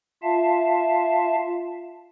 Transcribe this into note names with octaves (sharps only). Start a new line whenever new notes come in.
F4 E5 F5 A5